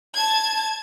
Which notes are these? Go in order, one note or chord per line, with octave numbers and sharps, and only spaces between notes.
A5 G#6